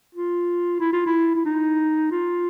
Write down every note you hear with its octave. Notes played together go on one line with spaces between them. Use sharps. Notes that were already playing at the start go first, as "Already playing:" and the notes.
F4
E4
F4
E4
E4
D#4
F4